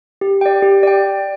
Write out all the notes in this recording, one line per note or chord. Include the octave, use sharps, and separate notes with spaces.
G4
D5 G5
G4
D5 G5